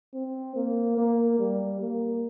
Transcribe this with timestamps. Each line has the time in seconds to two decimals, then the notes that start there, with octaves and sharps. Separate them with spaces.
0.14 C4
0.56 A#3
0.98 A#3
1.39 G3
1.81 A#3